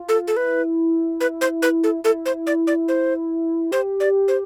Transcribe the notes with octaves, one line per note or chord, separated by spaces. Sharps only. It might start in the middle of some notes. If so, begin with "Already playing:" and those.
Already playing: F4
A4
A4
E4 B4
B4
C5
B4
A4
E4 A4
C5
D5
D5
C5
G4 C5
D5
C5